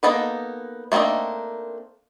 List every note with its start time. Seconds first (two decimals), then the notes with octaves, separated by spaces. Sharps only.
0.03 A#3 B3 D#4 A4 B4
0.92 A3 A#3 C4 D4 D#4